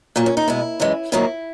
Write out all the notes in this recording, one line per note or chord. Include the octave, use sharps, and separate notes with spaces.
A#2 F#3 A#3
C#4
D#4
B2 G#3 E4
F#2 E3 G#3
G#2 D#3 F#3 A#3 E4